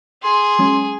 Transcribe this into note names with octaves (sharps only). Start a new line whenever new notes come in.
G#4 C6
F#3 G#3 C#4